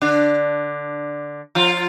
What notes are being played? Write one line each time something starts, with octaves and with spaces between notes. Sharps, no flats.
D3 D4
F3 F4